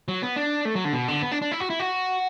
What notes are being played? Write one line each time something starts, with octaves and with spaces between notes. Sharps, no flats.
F#3
B3
D4
A3
F#3
D3
B2
D3
B3
D4
D4
E4
F#4
E4
F#4